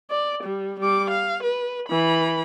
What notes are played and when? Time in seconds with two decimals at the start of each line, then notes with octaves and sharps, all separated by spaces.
0.10 D5
0.43 G3
0.79 G3 D6
1.10 F5
1.43 B4
1.89 E3 B5